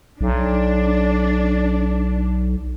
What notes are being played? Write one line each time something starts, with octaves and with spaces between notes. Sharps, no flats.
B1 D4